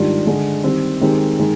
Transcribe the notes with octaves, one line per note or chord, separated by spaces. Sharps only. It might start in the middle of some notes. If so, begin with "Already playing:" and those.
Already playing: G#2 D#3 G3 D4 F4
D3 G#3 D4 G#4
D#3 G3 C4
D#3 G#3 C4 G4
D#3 G#3